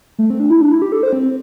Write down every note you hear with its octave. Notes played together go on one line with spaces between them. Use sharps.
A3
C4
D4
E4
D4
E4
G4
A4
C5
C4